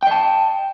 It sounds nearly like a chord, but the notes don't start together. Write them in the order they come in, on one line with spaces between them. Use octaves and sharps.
G5 D#5 A5